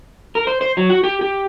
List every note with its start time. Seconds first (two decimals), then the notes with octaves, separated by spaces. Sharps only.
0.35 A#4
0.47 C5
0.61 C5
0.77 F#3
0.90 F#4
1.04 G4
1.21 G4